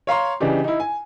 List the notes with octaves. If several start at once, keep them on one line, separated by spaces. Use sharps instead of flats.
C#5 F5 A#5 C6
C#3 E3 D4 D#4 G4
D#4 E4
G#5